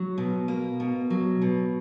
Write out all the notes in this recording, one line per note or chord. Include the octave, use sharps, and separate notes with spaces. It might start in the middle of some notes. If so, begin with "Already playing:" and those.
Already playing: F#3
B2
A#3
B2
F#3
B2